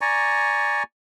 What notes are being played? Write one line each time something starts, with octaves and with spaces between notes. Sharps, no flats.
D5 G#5 A#5 C#6